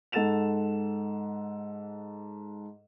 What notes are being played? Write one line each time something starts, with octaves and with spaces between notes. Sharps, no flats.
G#2 A4 F#5 A6 E7 F7